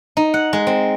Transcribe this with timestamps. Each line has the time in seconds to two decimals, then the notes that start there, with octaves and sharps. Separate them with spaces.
0.17 D#4
0.34 F#5
0.53 G#3
0.67 C4